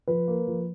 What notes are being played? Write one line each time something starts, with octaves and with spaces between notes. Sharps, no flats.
F3 B4
A#3
F3